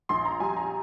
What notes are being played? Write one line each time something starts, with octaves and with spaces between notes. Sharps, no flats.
A#1 C6
A#5
G3 G#5
A#5